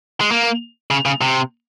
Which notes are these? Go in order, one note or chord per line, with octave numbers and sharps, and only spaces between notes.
G#3
A#3
C#3
C#3
C3